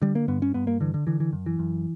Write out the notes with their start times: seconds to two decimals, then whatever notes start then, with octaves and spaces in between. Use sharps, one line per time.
0.02 D3 G3
0.15 A#3
0.28 G2 B3
0.42 C#4
0.54 G2 B3
0.67 A#3
0.81 D3 E3
0.94 D3
1.07 D3 E3
1.20 E3
1.33 F#2
1.46 E3
1.59 F#2